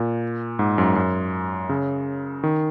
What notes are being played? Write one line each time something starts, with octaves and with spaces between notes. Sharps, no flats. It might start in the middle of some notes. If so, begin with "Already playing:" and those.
Already playing: A#2
G#2
F#2
F#2
C#3
D#3